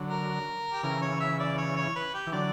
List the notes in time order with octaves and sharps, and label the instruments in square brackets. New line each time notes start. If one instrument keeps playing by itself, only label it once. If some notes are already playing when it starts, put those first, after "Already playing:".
Already playing: [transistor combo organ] D3 F#3
[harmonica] A#4
G4
[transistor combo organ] C#3 E3 [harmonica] A#4
[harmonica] C#5
E5
D5
C#5
C#5
B4
G4
[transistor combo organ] E3
[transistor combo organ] D3 F#3 [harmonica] D5